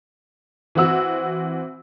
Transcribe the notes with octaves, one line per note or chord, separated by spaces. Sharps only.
E3 C4 F#4 E6